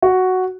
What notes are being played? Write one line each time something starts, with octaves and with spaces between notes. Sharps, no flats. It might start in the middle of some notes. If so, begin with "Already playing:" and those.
F#4